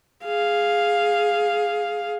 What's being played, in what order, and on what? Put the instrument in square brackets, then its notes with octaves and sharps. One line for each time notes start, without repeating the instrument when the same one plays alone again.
[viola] G#4 F5